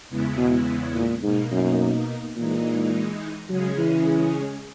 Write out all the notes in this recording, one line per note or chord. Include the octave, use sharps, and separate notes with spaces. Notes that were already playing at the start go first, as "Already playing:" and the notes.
E2 C#3 G#3 B3 E4
B2
A#2
G#2 B2 A#3 D#4
F#2
A#2 E3 G#3 D#4
C#3 F#3 G#3 C#4 G#4
E3